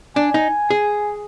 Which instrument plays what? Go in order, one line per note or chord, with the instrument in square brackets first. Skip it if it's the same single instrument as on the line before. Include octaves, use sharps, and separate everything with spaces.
[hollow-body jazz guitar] D4 [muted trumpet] G#5
[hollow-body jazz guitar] D#4
G#4